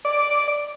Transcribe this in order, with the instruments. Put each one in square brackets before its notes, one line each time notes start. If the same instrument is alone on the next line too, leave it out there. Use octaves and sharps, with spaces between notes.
[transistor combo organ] D5